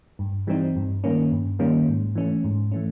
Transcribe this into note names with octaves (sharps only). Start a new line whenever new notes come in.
G2
E3 G3 C4 D#4
G2
D#3 G3 A#3 C#4
G2
D#3 G3 A#3 C#4
G#2
E3 A3 C#4
G#2
E3 A3 C#4